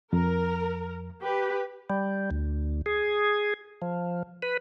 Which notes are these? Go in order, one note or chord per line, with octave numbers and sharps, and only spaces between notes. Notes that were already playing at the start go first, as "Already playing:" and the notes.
F2 A#4
G4 B4
G3
D2
G#4
F3
B4